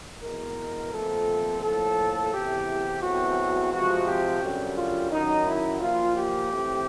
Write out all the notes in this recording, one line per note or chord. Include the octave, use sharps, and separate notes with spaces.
E2 B2 G#3 A#4
A#2 F3 A3 C4 A4
A2 F3 A#3 A4
E2 C3 E3 G4
E2 B2 F#3 A3 C4 F#4
C3 F3 G#3 C4 F#4
G4
F#2 D3 G3
F4
F#2 D#3 F#3 D#4
E4
A#2 F3 A#3 F4
G4
C3 E3 A3 C4